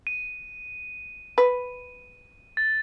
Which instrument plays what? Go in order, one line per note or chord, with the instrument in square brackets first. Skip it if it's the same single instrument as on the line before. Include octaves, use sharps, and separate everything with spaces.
[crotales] D#7
[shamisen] B4
[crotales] A6